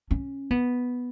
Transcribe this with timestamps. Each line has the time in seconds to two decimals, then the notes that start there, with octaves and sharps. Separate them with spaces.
0.11 C#4
0.51 B3